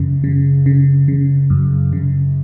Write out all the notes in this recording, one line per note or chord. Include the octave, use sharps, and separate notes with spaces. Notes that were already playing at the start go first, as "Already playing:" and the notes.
Already playing: F#2 C#3
C#3
C#3
C#3
F#2
C#3